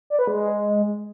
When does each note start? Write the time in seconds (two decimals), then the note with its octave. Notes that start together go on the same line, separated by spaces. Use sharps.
0.10 D5
0.19 B4
0.27 G#3